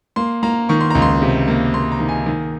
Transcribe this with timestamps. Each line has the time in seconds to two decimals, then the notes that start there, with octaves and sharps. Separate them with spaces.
0.16 A#3 C6
0.43 A#3 A#5
0.69 D#3 C#6
0.80 C6
0.91 C#2 A#5
1.02 C6
1.22 C3
1.48 A#3
1.74 A#3 C6
1.92 A#5
2.00 D#3
2.09 G#5
2.26 D#3